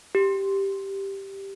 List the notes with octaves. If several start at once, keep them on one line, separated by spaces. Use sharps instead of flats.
G4